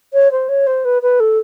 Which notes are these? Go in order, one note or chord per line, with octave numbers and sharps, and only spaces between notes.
C#5
C5
C#5
C5
B4
B4
A4